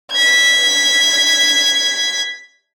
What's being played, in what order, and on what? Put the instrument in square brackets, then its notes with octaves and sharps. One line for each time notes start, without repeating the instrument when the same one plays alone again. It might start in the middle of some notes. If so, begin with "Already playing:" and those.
[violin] G#6 B6